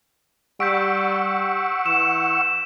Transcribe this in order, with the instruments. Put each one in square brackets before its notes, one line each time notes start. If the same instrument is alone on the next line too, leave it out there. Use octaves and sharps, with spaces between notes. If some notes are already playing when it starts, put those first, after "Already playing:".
[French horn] G3 [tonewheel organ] F#5 C#6 E6 [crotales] G6 B6 D7
[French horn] E3 [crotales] E7